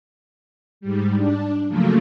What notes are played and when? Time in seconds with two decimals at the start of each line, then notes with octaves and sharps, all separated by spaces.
0.81 G#2 G3
1.16 D4
1.68 C#3 F3 F#3 A3 A#3